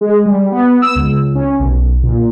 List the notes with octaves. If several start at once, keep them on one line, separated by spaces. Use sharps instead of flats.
G#3
G3
B3
E6
C#2
C#4
B1
A#2